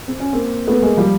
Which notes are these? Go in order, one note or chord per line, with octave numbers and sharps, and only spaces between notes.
C4
C#4
A#3 C4
A3 B3
G#3 A#3
F3 G3